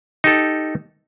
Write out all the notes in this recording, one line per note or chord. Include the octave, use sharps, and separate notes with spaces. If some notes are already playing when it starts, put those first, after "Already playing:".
D#4 G4 A4